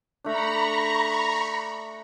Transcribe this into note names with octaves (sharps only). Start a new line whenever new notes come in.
A3 D4 A#5 B5 C#6